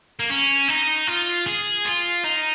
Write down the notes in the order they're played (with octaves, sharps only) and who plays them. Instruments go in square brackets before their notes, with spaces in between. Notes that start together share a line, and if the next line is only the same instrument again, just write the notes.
[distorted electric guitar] A#3
C#4
D#4
F4
G#4
F4
D#4